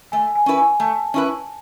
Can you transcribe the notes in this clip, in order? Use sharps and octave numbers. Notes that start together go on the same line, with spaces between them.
A3 G#5
G#5
C#4 E4 B4
G#5
A3 A5
C#4 E4 B4